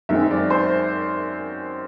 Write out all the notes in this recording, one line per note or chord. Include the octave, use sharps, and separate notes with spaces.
F#2 D#3 G#3 C4 E5
D5
C5